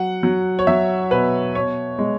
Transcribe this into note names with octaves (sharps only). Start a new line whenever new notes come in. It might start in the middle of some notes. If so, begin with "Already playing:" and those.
Already playing: F#3 F#5
F#3
C#5
F#3 E5
B2 B4
B2 C#5
G#3